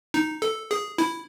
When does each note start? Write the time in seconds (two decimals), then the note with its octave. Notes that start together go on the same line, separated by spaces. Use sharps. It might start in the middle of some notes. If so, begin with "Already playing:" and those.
0.14 D#4
0.42 A4
0.71 G#4
0.98 E4